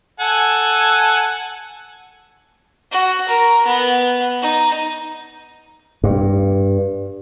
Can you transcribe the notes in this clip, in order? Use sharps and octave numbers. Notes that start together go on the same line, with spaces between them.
A4 F#5 G#5
F#4
A#4
B3
D#4
G2